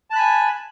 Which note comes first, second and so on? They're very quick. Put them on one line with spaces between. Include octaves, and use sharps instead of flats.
A5 F#6 B5 G#5